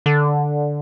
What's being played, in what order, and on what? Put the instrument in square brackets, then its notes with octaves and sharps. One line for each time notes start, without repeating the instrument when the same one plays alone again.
[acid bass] D3